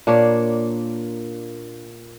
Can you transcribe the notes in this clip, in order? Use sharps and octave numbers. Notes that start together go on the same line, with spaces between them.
A#2 A#3 D4 C#5